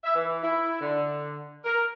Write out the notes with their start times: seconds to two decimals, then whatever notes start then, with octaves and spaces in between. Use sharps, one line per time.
0.03 E5
0.15 E3
0.42 E4
0.80 D3
1.64 A#4